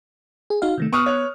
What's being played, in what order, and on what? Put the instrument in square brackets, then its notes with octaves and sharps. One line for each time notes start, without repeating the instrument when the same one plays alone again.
[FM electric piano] G#4
D#4 F#4 F5
C3 D#3 A3
[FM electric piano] B3 F#6 [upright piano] C#6 D#6 F6
[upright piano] C#5